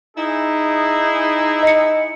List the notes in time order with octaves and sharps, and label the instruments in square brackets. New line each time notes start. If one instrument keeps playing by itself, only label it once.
[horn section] D#4 E4 G#4
[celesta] D#5 C#7